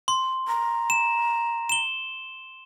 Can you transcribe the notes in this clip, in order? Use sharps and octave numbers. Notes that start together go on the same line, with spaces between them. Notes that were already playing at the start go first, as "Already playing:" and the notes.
C6
A#5
E7
E7 G7